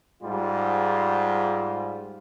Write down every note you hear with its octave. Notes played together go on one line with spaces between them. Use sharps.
G#2 G3 F4